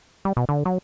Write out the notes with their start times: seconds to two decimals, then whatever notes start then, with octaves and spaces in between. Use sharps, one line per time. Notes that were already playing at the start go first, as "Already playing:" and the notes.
0.25 G3
0.37 B2
0.49 D3
0.65 F#3